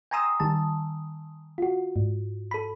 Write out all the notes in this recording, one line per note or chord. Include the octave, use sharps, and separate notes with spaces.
G5 G#5 A#5 C6 D#6 E6
D#3 G3 A5
F4 F#4
G#2
A4 B5